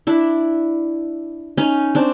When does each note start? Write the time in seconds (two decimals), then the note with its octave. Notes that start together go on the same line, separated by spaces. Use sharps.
0.07 D4 E4
1.58 C#4 D#4
1.95 C4 D4